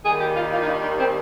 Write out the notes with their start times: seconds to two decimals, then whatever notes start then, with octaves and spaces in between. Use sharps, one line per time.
0.03 D#2 D#3 G3 A#3 G#4
0.19 G4
0.35 F4
0.51 F4
0.60 D#4
0.67 D4
0.98 C4